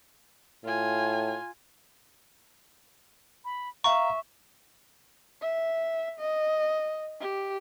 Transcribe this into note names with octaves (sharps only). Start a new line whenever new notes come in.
A2 F4 G#5
B5
E5 F5 A#5 C#6
E5
D#5
G4